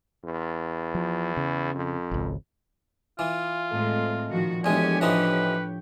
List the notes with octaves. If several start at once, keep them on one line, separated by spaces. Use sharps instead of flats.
E2
F3
C#3
F2
G#1 C#2
E3 F4
A2 G#3 C4 A4 D#5
A#2 D#3 F3 F#4
E2 G#3 A3 D4 G4 C#5 G#5
A2 E3 F3 D#4 B4 D6 A#6
G5 C#6